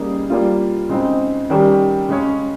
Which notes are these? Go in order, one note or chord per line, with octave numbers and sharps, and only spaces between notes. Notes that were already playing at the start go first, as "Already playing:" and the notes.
Already playing: C#3 G3 A#3 D#4 G#4
G3 A#3 F4
C#3 G#3 C4 D#4
D#3 G3 C#4 G4 A#4
C#3 G#3 C#4